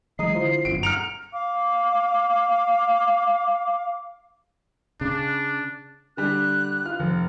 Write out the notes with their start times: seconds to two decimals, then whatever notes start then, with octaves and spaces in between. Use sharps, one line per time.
0.19 E3 F#3 G#3 D#5 A#5 D#6 C7
0.35 D3 E4 F4 C5
0.65 G1 F#2 B2 D7
0.83 A#5 F6 C#7 D7 F7
1.33 F5 D6
5.01 C#3 D4
6.17 D3 G3 G4 F#6
6.85 F4 F6
7.00 F1